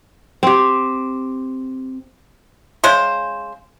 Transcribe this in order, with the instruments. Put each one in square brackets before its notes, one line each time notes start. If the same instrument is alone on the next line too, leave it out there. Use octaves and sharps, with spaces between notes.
[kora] C4 G4
[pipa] C#3 G#3 C5